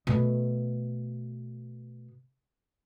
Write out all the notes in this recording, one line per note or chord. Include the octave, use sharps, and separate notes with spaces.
B2 A3